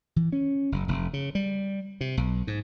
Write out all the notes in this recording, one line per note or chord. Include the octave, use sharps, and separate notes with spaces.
E3
C#4
F#1
F1
C#3
G3
C3
B1
G#2